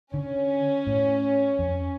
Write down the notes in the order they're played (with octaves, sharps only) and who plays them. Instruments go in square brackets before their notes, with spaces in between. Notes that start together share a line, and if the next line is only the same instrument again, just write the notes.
[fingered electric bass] D3 [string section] C#4
[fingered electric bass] A2
F2